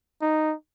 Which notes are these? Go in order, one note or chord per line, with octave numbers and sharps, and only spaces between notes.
D#4